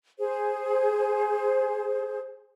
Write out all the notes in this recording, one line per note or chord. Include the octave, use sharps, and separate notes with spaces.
G#4 C5